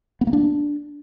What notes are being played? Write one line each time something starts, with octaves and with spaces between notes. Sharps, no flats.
B3
A#3
D4